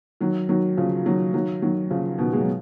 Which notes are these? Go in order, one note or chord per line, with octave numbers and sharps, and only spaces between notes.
D#3 F#3
D#3 F#3
C#3 F3
D#3 F#3
D#3 F#3
D#3 F#3
C#3 F3
B2 D#3
G#3
F#3